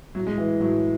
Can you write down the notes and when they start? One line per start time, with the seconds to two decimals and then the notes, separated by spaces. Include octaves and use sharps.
0.15 A2 F#3
0.27 G#3
0.38 E3
0.60 A2 F#3